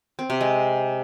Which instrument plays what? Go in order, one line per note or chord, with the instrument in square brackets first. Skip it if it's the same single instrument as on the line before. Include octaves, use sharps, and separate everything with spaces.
[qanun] C4
C3
G#3